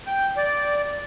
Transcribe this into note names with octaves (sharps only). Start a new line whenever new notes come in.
G5
D5